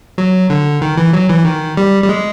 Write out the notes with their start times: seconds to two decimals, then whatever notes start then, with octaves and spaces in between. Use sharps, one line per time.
0.18 F#3
0.50 D3
0.82 D#3
0.97 E3
1.13 F#3
1.29 E3
1.45 D#3
1.77 G3
2.04 G3
2.09 G#3